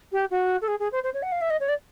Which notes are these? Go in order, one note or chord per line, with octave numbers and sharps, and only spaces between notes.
G4
F#4
A4
G#4
G#4
C5
C5
C#5
F#5
F5
E5
D#5
C#5
D5